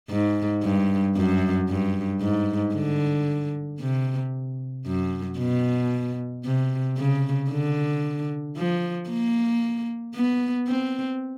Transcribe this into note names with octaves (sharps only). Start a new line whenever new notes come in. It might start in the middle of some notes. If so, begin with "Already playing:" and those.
G#2
G2
F#2
G2
G#2
D3
C3
F#2
B2
C3
C#3
D3
F3
A#3
B3
C4